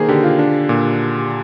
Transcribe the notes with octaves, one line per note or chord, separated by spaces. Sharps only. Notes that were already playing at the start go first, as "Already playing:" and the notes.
Already playing: D#3 A#3 G#4 C5
D3 G4
F4
D4
A#2